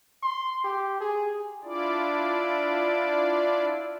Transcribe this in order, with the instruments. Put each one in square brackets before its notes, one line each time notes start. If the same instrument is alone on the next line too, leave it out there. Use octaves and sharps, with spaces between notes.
[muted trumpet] C6
G4
G#4
[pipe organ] D4 E4 F4 D5